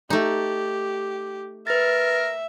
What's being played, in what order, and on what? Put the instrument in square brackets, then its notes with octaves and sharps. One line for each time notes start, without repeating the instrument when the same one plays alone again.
[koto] A3 D#4 [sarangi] G4
[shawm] A#4 [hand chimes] B4 A6 [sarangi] E5